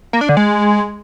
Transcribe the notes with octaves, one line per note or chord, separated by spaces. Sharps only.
A#3
D4
D3
G#3